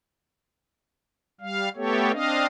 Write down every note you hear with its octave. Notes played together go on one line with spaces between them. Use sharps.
G3 F5
A3 B3 G4 A4 C#5
C4 D4 D#5 F5